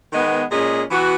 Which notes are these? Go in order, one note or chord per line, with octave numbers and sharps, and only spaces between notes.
D#3 G#3 B3
A#2 G#3 C#4 G#4
E3 B3 F#4